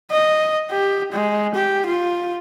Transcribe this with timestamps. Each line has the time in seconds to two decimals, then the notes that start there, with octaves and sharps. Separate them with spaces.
0.11 D#5
0.71 G4
1.12 G#3
1.55 G4
1.87 F4